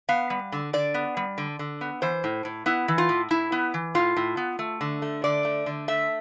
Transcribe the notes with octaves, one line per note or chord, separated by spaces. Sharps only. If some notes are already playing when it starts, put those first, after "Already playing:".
B3 F5
G3
D3
D3 D5
B3
G3
D3
D3
B3
E3 C5
A2
A2
B3 E4
E3
F4
A2
A2 E4
B3
E3
A2 F4
A2
B3
A3
D3
A3
D3 D5
A3
D3
A3 E5